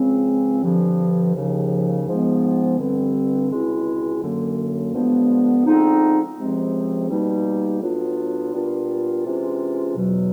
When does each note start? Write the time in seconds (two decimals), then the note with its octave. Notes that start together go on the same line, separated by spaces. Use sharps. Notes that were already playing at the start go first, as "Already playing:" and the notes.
Already playing: C#2 C#3 F3 G#3 C4
0.62 G2 D3 F3
1.35 D#2 C#3 F3
2.07 G#2 F3 G#3 B3
2.78 G2 D3 G3 C4
3.50 C#2 B2 G#3 C4 E4
4.22 F#2 D3 F#3 A#3
4.93 G2 D3 F3 G#3 B3
5.65 D3 F3 G#3 C4 D#4
6.37 C#2 C3 F3 G#3 C4
7.08 B2 G3 A#3 D#4
7.80 A2 F#3 B3 D4 F4
8.52 A#2 G3 B3 D4 F4
9.24 C3 E3 G#3 C#4 F4
9.96 E2 B2 F#3